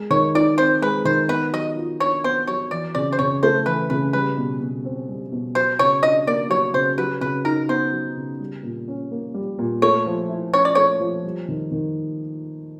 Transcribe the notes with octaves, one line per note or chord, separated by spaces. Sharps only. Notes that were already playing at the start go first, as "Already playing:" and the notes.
Already playing: G#3
D#3 C#5
D#4 D5
C4 C5
G#3 B4
D#3 C5
B3 B4
F#3 D#5
F4
D4 C#5
B3 C5
F#3 C#5
E3 D5
C#3 D5
C5
C#3 C#5
A3 C5
E3 B4
C#3 B4
G3 B4
B2
B2
C4
G3
B2
F#3 C5
C#3 C#5
D4 D#5
A#3 D5
F#3 C#5
C#3 C5
F#3 B4
C#3 B4
D#4 A#4
B3 C5
F#3
C#3
G3
A#2
C#4
A#3
G3
A#2
A3 C#5
F3
E4
C#4 C#5
D5
A3 C#5
F3
G3
D#3
D#3